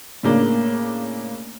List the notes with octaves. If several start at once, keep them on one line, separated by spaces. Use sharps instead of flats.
A2 C#3 A#3 D4